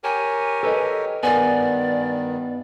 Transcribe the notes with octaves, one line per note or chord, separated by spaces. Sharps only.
G4 A#4 C#5 G#5
A4 B4 D#5
G2 D#3 B3 A#4 D5 G#5